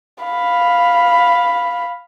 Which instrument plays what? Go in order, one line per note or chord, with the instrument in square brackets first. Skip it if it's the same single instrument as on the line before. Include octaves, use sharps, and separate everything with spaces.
[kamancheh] F5 B5